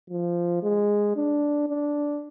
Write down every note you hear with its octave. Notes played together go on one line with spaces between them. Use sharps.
F3
G#3
D4
D4